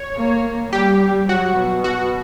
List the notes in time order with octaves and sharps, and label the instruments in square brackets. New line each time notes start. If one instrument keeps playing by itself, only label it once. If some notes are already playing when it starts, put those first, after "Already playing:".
Already playing: [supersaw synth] C#5
[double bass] A#3
[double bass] G3 [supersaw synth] G4
[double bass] G3
[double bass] F#3 [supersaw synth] F#4
[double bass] B2
[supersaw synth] F#4